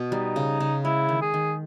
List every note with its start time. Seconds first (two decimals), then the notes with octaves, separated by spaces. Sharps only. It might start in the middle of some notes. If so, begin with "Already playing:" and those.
Already playing: B2
0.12 G3 D#4
0.36 C#3
0.60 C#3
0.85 G#3 E4
1.09 D#3
1.22 G#4
1.34 D#3